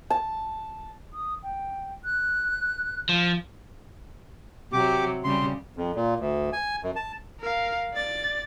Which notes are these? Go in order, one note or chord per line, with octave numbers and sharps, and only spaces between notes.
A5
D#6
G5
F#6
F3
C3 F#3 G4 D6
C#3 G3 C6
F2
A#2
D2
G#5
F#2
A5
A#4 F5
D5 A6